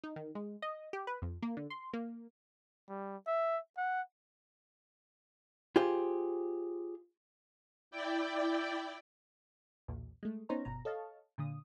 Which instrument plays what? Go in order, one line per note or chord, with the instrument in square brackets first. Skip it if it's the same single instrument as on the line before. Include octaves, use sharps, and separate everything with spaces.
[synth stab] D#4
D#3
G#3
D#5
G4
B4
F2
A#3
D3
C6
A#3
[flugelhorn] G3
E5
F#5
[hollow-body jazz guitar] F4 G4 G#4 C5
[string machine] E4 D5 G5
[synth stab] B1 E2 A#2
G#3 A3
B3 C#4 D#4 C5 C#5 A#5
G1 B2 A#5
A4 C#5 D#5 F5 A5
A#2 D3 D#6